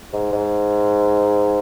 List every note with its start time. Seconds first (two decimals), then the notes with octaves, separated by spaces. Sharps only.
0.13 G#2
0.32 G#2